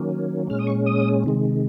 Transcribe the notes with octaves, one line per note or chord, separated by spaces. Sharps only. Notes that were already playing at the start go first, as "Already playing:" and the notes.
Already playing: D#3 F#3 A#3 C#4
A#2 G#3 C#4 F6
D#6
C#6
D#6
C3 D#3 G#3